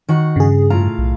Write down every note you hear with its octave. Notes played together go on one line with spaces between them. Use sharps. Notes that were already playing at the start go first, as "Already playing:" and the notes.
D#3 F#4 F#5
G2 C#3 G#4
A2 F4 F5 A#5
B1